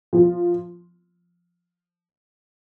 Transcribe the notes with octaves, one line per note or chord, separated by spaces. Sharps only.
F3